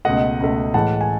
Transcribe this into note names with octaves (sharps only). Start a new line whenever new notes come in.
C#2 B2 A3 D#5 F#5
C#2 B2 A3
A2 E3 G#3 F#5 A5
G#5